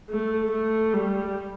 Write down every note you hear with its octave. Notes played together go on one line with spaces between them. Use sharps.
A3
A3
G3